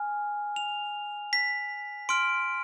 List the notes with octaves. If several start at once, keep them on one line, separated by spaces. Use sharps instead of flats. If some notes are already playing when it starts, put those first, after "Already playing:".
Already playing: G#5 F6
F7
B6
C6 F6 D7